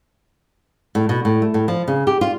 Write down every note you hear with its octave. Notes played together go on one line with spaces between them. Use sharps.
A2
B2
A2
A3
A2
F3
C#3
G4
F4